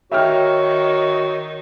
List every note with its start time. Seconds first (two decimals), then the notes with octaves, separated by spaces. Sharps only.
0.12 D#3 F#4 C#5 E5 G5 F6